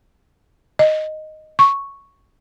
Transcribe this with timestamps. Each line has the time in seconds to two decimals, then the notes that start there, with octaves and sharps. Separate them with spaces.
0.79 D#5
1.59 C#6